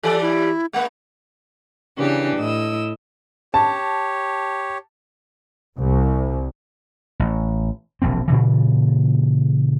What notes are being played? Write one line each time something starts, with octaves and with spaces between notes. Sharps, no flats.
E3 G3 A4 D5
E4
G#3 A#3 F#5
C#3 E3 D4 G4
A2 E4 D#5 E6
G4 C#5 A5
C2
A1
E1 A#1 E2 C4
A#2 C#3 E3